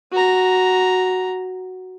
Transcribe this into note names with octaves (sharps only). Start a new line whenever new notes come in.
F#4 A#5